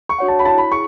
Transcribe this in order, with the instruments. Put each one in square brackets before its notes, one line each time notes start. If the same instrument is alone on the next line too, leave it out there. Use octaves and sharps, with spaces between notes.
[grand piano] C#6
[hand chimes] D4 F#4 C#5 F#5
[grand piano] A5
B5
[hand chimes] E4 [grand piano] A5
[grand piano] B5
[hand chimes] G#4 [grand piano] C#6